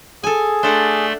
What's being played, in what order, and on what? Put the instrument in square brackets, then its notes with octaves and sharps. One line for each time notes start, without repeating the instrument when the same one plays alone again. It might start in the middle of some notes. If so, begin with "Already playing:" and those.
[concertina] G#4 [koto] A4 G#5
[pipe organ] A3 D5 C6 [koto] D4 A4 F#5